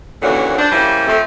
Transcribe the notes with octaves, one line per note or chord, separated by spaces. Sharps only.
D#2 A#2 D3 E3 C#4 F#4
D4 C5
C#3 F3 G3 A#3 E4 C5
F3 A3 C4